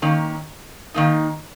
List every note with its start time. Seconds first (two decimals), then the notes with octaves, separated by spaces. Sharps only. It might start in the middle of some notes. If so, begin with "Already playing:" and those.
0.02 D#3 A#3 C#4
0.94 D#3 A#3 D#4